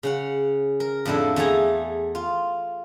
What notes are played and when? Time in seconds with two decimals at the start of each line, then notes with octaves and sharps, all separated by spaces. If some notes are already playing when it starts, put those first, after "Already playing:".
0.03 C#3 C#4 F#5
0.80 A#4
1.05 F2 A2 D3 E4 A4
1.36 E2 A3 G#4 A4 G#5 A#5
2.15 F4